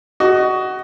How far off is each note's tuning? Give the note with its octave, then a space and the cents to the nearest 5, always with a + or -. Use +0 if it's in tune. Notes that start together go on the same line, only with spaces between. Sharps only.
F#4 +20 D#5 +0